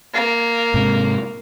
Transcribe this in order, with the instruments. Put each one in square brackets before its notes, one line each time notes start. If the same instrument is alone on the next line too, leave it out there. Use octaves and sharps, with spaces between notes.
[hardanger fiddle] A#3
[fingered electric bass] G#2 C3 G#3